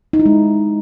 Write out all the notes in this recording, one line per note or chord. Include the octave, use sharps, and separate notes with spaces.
D#4
E4
G#3